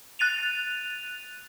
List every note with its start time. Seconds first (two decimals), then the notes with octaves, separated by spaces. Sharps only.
0.19 F#6 A6 D#7 F7